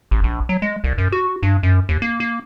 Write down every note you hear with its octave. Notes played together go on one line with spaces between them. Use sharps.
A1
A#1
F#3
G#3
C2
F#2
F#4
G2
F#2
D#2
A#3
A#3